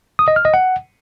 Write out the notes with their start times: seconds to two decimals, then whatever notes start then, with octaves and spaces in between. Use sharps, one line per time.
0.19 D#6
0.28 D#5
0.36 F6
0.45 D#5
0.54 F#5